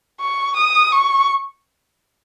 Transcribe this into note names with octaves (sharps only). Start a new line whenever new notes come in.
C#6
D#6
C#6